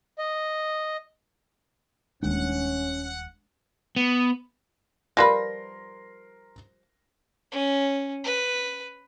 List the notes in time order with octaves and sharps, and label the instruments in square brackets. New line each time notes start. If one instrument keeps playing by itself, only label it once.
[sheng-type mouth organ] D#5
[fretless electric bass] D#1 G#1 D#2 [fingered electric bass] G#3 D4 [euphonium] C#4 [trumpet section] F#5
[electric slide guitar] B3
[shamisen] F3 G3 B4 [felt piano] A#4 C6 A#6
[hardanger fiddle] C#4
B4